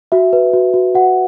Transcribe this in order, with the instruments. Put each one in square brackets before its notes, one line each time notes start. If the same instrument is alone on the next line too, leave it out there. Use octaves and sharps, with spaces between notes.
[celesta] F#4 E5
B4
F#4
F#4
F#4 F#5